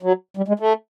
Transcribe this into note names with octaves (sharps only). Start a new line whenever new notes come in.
F#3
G3
G#3
A3